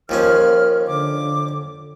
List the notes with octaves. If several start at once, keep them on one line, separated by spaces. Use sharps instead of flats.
D#2 F3 C#4 A#4 F6
D3 D6